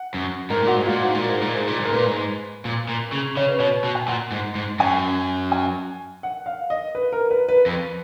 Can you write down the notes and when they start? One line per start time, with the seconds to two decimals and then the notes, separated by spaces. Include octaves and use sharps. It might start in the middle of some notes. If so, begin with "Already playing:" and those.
Already playing: F#5
0.14 F#2
0.50 G#2 A#4
0.63 A#2 F#4
0.76 G#2
0.86 A#2 F4
1.03 G#2 F#4
1.15 A#2
1.22 A#4
1.29 G#2
1.41 A#2
1.54 G#2
1.67 A#2
1.80 G#2 A#4
1.93 A#2 B4
2.06 G#2
2.65 A#2
2.88 A#2
3.12 C#3
3.37 C#3 C#5
3.48 B4
3.59 B2 C#5
3.84 B2
3.95 G#5
4.07 A#2 F#5
4.32 G#2
4.55 G#2
4.79 F#2 G#5
5.52 G#5
6.23 F#5
6.46 F5
6.70 D#5
6.95 B4
7.12 A#4
7.31 B4
7.49 B4
7.66 F2